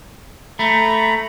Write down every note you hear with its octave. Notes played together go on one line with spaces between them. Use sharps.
A3 A#5 B5